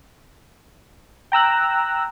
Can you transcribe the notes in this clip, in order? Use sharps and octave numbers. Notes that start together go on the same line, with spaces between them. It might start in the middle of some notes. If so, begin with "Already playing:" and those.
G5 A#5 E6 F#6